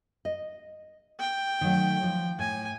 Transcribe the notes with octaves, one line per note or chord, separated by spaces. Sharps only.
D#5
G5
D#3 F#3 A3
F3
A2 G#5